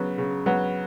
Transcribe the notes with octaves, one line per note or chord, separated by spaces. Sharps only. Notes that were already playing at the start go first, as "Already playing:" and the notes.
Already playing: C#3 F#3 B3
C#3
F#3 B3